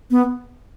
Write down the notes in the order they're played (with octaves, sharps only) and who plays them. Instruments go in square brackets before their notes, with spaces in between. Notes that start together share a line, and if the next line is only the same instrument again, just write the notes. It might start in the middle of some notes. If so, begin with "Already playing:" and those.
[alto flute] B3